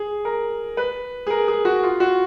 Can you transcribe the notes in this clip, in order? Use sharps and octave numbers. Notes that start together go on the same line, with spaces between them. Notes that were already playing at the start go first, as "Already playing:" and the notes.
Already playing: G#4
A#4
B4
G#4
A#4
G#4
F#4
F4
F#4